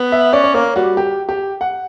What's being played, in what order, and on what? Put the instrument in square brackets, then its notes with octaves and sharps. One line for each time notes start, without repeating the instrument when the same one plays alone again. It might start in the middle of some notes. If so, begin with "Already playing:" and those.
Already playing: [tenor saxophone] B3
[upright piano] E5
[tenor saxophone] C#4 [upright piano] D5
[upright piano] D5
[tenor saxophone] A#3 [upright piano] C#5
[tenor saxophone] G3 [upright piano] F#4
[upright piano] G4
G4
F#5